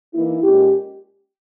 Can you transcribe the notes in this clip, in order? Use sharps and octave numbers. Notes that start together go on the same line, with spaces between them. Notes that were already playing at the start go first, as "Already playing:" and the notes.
E3 A#3 D#4 E4
A#2 G#3 C#4 G4